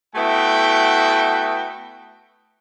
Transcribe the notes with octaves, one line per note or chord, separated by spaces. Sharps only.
A3 B3 E4 F#4 G5